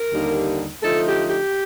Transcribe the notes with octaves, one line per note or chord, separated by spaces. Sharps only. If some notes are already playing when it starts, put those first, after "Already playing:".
Already playing: A#4
D#2 D3 G3 A#3 D#4
D3 F3 A3 D#4 A4
G4
G4